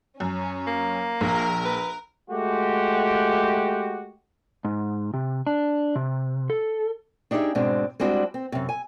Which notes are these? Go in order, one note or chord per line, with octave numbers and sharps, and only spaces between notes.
F#2 C#4
A#3
A#1 A#4
B4
G#3 A3 F#4 G4
G#2
C3
D4
C3
A4
D4 D#4 G4 G#4 E5
G#2 B2 G#3 C4 D4
G3 G#3 C4 D4 E4 F#4
C4
F#2 C3
G#5